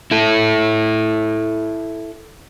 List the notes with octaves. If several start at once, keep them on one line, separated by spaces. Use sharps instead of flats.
E4 A4